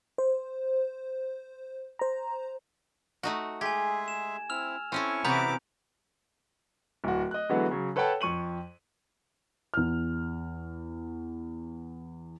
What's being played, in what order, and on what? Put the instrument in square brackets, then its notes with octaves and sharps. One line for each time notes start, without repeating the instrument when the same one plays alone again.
[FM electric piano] C5
C5 A#5
[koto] A3 D#4 F#4
[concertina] G#3 G#4 E5 [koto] G4 [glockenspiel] G#5 G#6
[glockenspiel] E7
[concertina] C4 E4 [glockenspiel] E6 F6 F7
[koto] C4 C#4 A4 [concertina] E4 G#5 C#6
[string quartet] C3 E3 D6 [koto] B3 F#4 [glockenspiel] A#5 B5 G6
[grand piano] D1 F#4
D#5 F#6
D3 E3 F#3 G#3 B3 F#4
C#3 F#3
A4 B4 C#5 F#5 G5 A5
F2 C#6 D#7 F#7
[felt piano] E2 F6